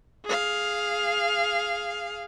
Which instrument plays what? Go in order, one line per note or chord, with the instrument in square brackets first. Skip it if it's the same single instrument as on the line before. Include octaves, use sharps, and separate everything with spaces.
[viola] G#4 F5